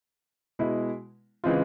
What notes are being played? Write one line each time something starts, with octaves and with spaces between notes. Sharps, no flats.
B2 G#3 B3 E4
C#3 E3 G#3 C4 F4